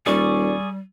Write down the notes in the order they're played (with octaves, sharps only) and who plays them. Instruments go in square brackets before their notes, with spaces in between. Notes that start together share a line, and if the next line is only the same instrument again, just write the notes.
[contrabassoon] D#1 [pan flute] G3 [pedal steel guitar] G#4 D5 C#6